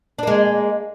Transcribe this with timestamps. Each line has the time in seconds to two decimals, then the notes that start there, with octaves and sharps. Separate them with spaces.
0.19 D4
0.23 A#3
0.27 G#3